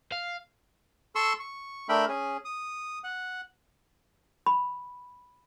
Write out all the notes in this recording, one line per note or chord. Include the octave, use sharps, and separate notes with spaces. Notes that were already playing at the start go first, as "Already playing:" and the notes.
F5
A4 C6 C#6 E6
C#6
A3 D4 A#4 E5 G5 B5
C#4 G#4
D#6
F#5
B5